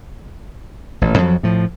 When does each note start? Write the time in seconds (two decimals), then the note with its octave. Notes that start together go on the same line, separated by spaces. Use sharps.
1.01 A1 A#2
1.18 F2 F3 F#3
1.43 A2 F3